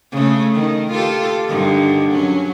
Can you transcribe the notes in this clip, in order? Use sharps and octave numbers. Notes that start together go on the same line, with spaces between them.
C#3 A3
D#3
F4 G4 A4
G2 D3 D#3
F#3 C#4